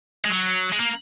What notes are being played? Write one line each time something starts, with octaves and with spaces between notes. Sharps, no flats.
G#3
F#3
G#3
A#3